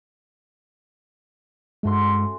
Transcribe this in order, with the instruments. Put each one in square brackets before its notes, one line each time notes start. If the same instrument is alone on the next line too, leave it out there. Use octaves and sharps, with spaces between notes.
[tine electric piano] G2 G#3 [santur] A3 F#4 C6
[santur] C#4